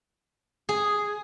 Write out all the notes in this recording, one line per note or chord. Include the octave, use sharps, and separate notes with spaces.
G#4